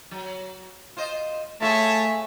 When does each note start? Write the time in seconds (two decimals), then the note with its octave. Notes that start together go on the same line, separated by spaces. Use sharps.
0.11 F#3
0.97 F4 C5 D#5
1.62 A3 F4 G#4 C#5 E5 A5